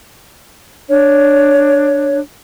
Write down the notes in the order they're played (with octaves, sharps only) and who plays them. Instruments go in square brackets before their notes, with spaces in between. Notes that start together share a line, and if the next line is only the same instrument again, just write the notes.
[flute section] D4 C#5